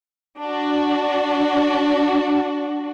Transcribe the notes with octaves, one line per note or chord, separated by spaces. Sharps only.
D4 F#4